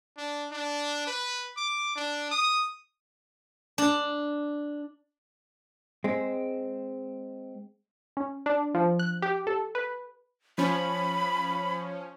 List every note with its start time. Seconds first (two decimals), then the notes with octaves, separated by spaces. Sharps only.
0.17 D4
0.51 D4
1.07 B4
1.57 D6
1.96 D4
2.31 D#6
3.78 D4
6.04 G#3 C4
8.17 C#4
8.46 D4
8.74 F3
8.99 F#6
9.22 G4
9.47 A4
9.75 B4
10.58 F3 C#4 B5